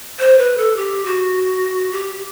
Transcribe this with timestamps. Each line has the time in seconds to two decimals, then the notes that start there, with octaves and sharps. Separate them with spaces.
0.19 C5
0.38 B4
0.58 A4
0.77 G4
1.06 F#4
1.92 G4